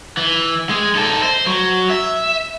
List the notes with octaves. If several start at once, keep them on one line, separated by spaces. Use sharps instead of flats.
E3
G#3
D#4 A4
C5
F#3
E5